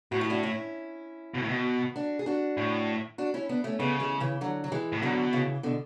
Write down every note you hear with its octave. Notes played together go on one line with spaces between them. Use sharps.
A2 F#4
E4
D4 F#4
C#4 E4
B2
A2
B2
D4 F#4
G#4
D4 F#4
A2
D4 F#4
C#4 E4
B3 D4
A3 C#4
C#3 G#3 B3
E3 G#3
C#3 E3
D3 F#3
F#3
E3 G#3
A2
B2 D3 F#3
C#3 E3
B2 D3